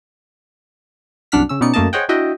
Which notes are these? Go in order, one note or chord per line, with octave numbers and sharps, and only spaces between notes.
C2 F#2 D4 F#5 F6 B6
C#3 C#4 E6
B2 B3 C#4 D#4 D5 C#7
F#2 A3 A#3 D#5 A5
G#4 C5 C#5 D#5 F#5 G5
D4 E4 F#4 D#5 E5 G5